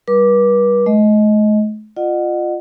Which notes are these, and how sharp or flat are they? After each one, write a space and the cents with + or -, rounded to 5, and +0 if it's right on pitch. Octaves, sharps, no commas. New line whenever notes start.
G3 +0 B4 -40 D6 +0
A3 -45 D#5 +15
F4 +0 D#5 -40 F#5 +5